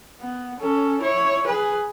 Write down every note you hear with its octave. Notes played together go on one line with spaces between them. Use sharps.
B3
C#4 A4
E4 C#5
G#4 B4